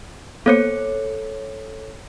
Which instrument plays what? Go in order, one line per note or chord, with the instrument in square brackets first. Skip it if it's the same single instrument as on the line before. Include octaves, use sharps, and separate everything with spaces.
[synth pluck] A#3 B3 C5 [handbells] A4 C#5 C#7